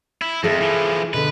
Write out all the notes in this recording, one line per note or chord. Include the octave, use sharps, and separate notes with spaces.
E4
F2 G#4 A4 E5
E3 F3
B2 D3 B4